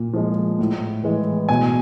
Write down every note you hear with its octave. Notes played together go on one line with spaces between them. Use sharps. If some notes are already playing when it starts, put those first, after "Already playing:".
Already playing: A#2
F3 G#3
A2
E3 G#3
B2 G#5